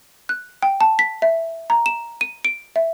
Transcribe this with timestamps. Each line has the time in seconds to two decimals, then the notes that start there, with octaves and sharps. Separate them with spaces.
0.29 F#6
0.63 G5
0.81 A5
0.99 B6
1.22 E5
1.70 A#5
1.86 E7
2.21 D#7
2.45 D7
2.76 E5